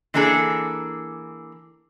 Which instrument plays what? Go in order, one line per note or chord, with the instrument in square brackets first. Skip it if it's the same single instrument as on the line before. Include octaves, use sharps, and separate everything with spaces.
[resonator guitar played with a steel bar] E3 A#3 D4 G#4 A4